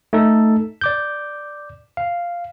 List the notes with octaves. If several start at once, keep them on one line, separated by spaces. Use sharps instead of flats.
A3 D#4 A4
D5 D6 G6
F5